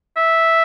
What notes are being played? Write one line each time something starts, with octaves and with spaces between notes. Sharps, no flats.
E5